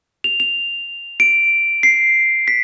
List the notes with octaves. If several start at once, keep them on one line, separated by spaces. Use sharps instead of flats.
F7
F7
D7
C7
B6